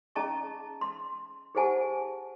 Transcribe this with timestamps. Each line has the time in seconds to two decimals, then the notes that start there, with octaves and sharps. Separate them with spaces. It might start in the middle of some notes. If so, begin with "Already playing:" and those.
0.16 C#4 G#4 D#5 A5 A#5 C#6
0.81 C6
1.55 G4 G#4 C5 F#5 G#5 A5